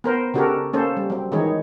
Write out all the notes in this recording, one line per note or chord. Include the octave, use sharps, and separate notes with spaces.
B3 A#4 C5
C#3 D4 F#4 G4 A4 A#4
A#3 C#4 A4 C5
G3
F#3 C4
D#3 E3 G#3 D#4 G#4 C#5